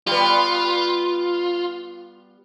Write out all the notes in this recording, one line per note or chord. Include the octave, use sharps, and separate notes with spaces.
G3 B3 F4